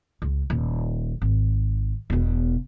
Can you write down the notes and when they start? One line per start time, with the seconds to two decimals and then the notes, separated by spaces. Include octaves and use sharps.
0.22 C#2
0.50 D#1
1.22 G#1
2.10 E1 B2